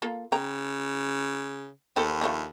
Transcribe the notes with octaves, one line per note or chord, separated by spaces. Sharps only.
A#3 F4 A4
C#3 G5 A#5
D#2 D#3 C4 A4
F3 A3 D4